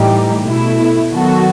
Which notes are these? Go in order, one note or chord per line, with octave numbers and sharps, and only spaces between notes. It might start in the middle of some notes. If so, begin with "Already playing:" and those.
Already playing: A2 E3 G3 D#4 G4
B2 A3 E4
D#3 F#3 B3 F#4 A4